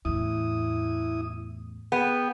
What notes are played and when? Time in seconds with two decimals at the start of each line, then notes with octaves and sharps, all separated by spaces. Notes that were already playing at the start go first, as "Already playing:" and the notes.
0.05 E2 A2 E4 D#6
1.92 B3 G#4 G5